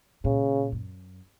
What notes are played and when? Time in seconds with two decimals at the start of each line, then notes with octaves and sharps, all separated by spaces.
0.24 A#2 C#3
0.72 F#2